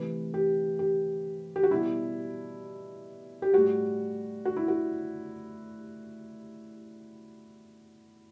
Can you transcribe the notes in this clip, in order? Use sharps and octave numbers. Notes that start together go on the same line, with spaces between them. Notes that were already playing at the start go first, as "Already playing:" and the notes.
Already playing: C3 E3 A3 B4
G4
G4
G4
F#4
B2 G3 E4
G4
A2 G3 F#4
F#4
E4
F#4